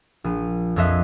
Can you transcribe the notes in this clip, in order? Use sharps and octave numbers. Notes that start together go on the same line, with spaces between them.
A#1 D#7
F2 F3 C#5 D#5 E5 F#6